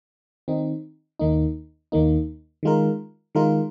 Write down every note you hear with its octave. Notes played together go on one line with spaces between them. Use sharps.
D#3 C4 D#4
D#2 D#3 A#3 D#4
D#2 D#3 A#3 D#4
D#3 G#3 F4 A#4
D#3 G#3 F4 A#4